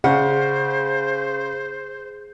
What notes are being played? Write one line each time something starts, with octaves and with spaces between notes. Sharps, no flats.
C#3 G#4 C5 F#5